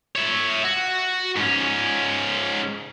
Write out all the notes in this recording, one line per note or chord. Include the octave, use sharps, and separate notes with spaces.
C#5 E5
F#4
G#2 C#4